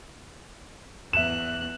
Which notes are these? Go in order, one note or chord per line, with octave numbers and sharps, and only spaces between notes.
E2 E5 F#6 E7